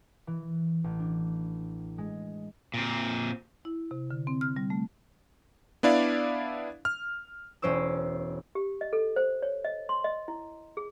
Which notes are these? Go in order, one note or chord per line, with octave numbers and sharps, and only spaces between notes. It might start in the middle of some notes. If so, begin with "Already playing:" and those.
E3
A1
D4
G#3
A#2 C4
E4
C3
D3
C4
F6
G3
A3
B3 D4 E4 D5 F5
F6
E1 C#4 C5 D6 E6
G4
D#5
A4
C5
C#5
D#5
C6
D#5
E4
G#4